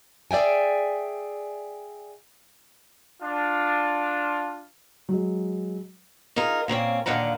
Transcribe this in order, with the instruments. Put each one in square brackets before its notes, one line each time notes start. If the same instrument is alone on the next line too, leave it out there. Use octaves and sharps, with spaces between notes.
[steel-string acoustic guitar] G#4 D5 E5 G5 G#5
[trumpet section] D4 F4
[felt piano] F#3 G#3
[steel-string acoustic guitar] D#4 F4 G#4 A#4
A#2 A#3 C4 C#4
D#2 A#2 D3 F5 F#5 A#5